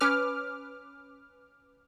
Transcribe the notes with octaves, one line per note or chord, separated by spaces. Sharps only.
C#4 B4 D6 F6